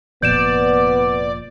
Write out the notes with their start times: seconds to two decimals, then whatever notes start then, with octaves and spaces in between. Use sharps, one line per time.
0.22 F1 A#2 F3 B3 D5 G6 D7 E7